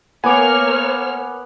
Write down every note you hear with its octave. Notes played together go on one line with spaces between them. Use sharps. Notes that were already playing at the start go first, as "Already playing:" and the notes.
A#3 B3 C#5 G#5 D6 F6